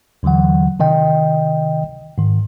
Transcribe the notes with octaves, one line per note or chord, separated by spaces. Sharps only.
D#2 D3 E3 F#3 F#5
C3 D#3 D#5 G5
G#2 D#3